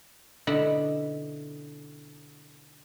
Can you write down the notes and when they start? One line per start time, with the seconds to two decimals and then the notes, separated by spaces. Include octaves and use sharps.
0.47 B2 D3 D#4 E4 B5